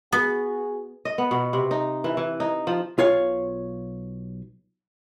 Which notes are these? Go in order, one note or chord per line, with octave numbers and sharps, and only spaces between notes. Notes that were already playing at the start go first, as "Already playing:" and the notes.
B3 F#4 G#4
D#5
B3
B2
C3
D#4
E3
E3
D#4
F3
B1 F4 C#5 F5